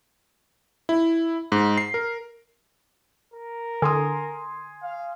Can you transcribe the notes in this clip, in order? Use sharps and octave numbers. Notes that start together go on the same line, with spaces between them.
E4
G#2
C7
A#4
A#4
D3 G#5 C6 D#6
F5